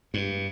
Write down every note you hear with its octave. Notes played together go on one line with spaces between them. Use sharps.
G2